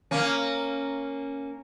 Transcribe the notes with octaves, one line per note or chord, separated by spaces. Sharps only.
A#3 C#4